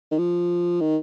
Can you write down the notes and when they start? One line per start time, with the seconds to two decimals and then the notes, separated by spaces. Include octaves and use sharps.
0.11 D#3
0.19 F3
0.81 D#3